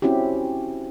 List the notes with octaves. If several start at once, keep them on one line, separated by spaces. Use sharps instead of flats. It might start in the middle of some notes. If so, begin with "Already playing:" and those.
C4 C#4 E4 F#4 G4